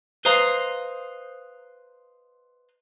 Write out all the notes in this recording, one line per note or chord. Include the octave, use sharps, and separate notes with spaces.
B4 C5 D#5 F5 A#5